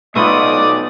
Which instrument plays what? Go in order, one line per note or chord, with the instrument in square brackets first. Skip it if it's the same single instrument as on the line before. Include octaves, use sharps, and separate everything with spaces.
[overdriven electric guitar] B1 [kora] A3 B3 F4 [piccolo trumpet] D5 [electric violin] D#6